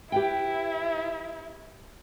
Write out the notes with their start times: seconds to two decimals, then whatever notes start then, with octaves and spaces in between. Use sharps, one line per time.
0.12 E4 G4 B4 G5